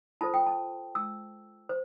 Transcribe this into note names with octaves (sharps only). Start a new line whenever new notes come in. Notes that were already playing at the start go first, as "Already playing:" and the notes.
F4 A4 C5 A5
G5
A5
E6
C5